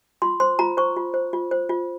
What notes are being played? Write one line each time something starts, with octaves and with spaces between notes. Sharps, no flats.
F4 C6
C5 C6
F4 A#5
C5 C#6
F4
C5
F4
C5
F4